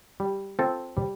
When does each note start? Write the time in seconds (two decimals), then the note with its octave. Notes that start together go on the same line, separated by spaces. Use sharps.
0.20 G3
0.59 C4 F4 A4
0.97 G3